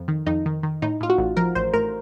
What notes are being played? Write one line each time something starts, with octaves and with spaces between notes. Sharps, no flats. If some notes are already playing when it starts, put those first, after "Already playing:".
Already playing: F2
D#3
F2 D#4
D#3
D#3
A2 D#4
A2 F4
F#4
A1
F3 A#4
A1 C5
A2 A#4